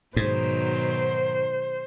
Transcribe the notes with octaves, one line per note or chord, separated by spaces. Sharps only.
G#2 B2 D#3 F#3 C5